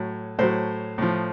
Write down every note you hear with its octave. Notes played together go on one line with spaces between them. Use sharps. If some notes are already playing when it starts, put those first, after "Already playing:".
Already playing: A2 F#3
A2 F#3 A4 C5
A2 F3